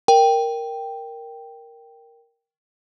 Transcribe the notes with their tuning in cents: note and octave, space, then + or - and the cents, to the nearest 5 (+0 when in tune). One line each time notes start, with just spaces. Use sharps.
A#4 +0 G5 +0